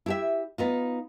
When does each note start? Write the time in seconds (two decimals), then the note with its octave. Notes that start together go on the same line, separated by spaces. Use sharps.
0.06 E4 G4 E5
0.58 B3 D#4 F4